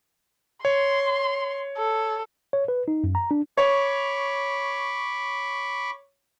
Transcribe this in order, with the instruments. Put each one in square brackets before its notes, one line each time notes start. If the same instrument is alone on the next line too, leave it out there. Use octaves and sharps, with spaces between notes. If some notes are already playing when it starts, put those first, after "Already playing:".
[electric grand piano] C#5 [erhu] C6
[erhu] A4
[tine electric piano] C#5
B4
D#4
F#2
A#5
D4
[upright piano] C#5 [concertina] B5 C#6 D6